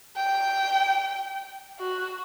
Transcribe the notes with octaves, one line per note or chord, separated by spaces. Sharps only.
G5
F#4